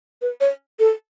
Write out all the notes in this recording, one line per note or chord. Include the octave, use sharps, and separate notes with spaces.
B4
C#5
A4